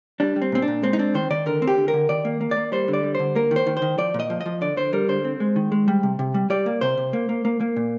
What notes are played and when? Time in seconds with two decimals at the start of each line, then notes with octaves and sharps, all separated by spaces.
0.20 G3 D4
0.36 G3
0.42 C4
0.52 A#2 C4
0.62 D4
0.68 A#2
0.83 G#3 C4
0.93 D#4
0.99 C4 D4
1.14 D#3 C5
1.30 D#3 D5
1.46 D3 A#4
1.62 C4
1.67 G4
1.78 D3
1.88 A#4
1.93 D3
2.09 D#3 D5
2.25 A#3
2.41 A#3
2.51 D5
2.56 A#3
2.72 G3 C5
2.88 D3
2.93 D5
3.03 G3
3.15 D3 C5
3.35 A#3 A#4
3.51 D#3
3.56 C5
3.67 D#3
3.77 C5
3.82 D#3
3.98 F3 D5
4.14 A#2
4.20 D#5
4.30 F3
4.41 D#5
4.46 F3
4.61 D3 D5
4.76 D3 C5
4.93 G3 A#4
5.08 D3 C5
5.25 C4
5.40 G#3
5.56 D#3
5.72 G#3
5.88 G3
6.03 C3
6.19 C3
6.34 G3
6.50 G3 D5
6.66 A#3
6.81 C3 C5
6.97 C3
7.13 A#3
7.29 A#3
7.45 A#3
7.61 A#3
7.76 A#2